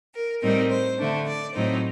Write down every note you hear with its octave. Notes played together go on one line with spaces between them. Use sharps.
A#4
A2 G3 C4 D#4 A#4
C5
D3 A3 D4
D5
A2 F#3 C4 D#4 C5